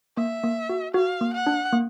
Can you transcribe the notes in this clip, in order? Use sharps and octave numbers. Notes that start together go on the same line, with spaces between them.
A#3 E5
A#3
F#4
F#4 F5
A#3
F#5
D4
A#3